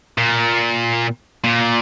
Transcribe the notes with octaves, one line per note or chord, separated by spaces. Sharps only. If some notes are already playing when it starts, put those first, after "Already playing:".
A#2
A#2